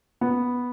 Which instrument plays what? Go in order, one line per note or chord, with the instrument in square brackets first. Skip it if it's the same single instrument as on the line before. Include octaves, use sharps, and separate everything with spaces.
[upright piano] B3